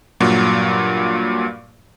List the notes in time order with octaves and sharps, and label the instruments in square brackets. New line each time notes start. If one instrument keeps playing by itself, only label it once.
[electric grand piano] G2 A#2 F#3